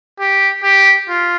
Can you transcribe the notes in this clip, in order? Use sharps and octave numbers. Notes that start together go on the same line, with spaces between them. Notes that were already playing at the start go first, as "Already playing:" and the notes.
G4
G4
F4